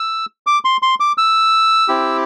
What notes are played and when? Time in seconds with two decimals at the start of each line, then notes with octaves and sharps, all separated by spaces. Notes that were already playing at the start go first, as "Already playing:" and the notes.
Already playing: E6
0.47 D6
0.65 C6
0.82 C6
1.00 D6
1.18 E6
1.88 C4 E4 G4